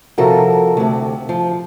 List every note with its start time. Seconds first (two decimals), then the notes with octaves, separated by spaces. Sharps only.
0.18 C3 F3 F#4 A4 A#4
0.77 D2 C3
1.29 F3